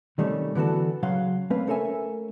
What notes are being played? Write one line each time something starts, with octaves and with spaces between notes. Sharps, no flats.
C3 D#3 G3 A3 C#4
D3 E3 B3 F#4 A4
C#3 F#3 F5 F#5 C6
A3 A#3 C4 C#4 B4 F5
A3 C#4 A4 A#4 E5 G#5